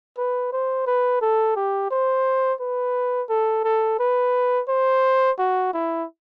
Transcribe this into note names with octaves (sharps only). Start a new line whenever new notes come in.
B4
C5
B4
A4
G4
C5
B4
A4
A4
B4
C5
F#4
E4